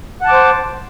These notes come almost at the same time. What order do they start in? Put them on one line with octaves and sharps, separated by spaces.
F#5 A5 D6 C5